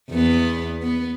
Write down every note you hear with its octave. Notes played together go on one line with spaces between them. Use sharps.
E2 B3
B3